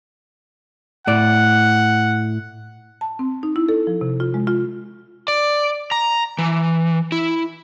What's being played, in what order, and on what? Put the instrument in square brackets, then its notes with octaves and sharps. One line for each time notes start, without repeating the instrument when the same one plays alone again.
[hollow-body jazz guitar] A2 D5 [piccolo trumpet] F#5
[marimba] A5
C4
D#4
E4
A4
F3
C3
F4
G#3
F4
[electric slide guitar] D5
A#5
E3
E4